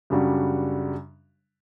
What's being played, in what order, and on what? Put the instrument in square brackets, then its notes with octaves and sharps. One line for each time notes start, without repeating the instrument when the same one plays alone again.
[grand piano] F#2 C#3 G3 D4 F#4